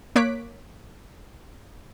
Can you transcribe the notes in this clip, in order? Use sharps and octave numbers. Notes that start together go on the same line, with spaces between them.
A#3 C#5 D6 F#6 B6 D7